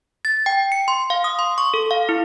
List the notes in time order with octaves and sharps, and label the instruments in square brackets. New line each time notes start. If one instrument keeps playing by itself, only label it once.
[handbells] A6
G5
C#7
C6
F5
D#6
C6
C#6
A4
F5
E4